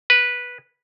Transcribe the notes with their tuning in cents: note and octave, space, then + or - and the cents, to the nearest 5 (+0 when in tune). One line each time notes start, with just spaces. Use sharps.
B4 -10